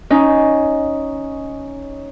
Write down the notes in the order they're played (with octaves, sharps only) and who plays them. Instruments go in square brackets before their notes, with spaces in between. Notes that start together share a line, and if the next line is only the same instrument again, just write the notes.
[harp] C#4 D#4